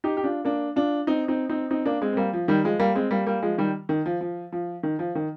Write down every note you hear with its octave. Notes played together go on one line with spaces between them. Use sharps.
D#4 G4
G4
D4 F4
A#3 D4
D4 F4
C4 D#4
C4 D#4
C4 D#4
C4 D#4
A#3 D4
G#3 C4
C4
G3 A#3
F3
D#3 G3
F3 G#3
G3 A#3
G#3 C4
G3 A#3
G3 A#3
F3 G#3
D#3 G3
D#3
F3
F3
F3
D#3
F3
D#3